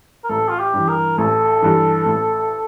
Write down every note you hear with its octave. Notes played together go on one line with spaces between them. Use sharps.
A#4
A1 A4
F4
G4
G2 E3
A#4
A1 A4
G2 E3
A1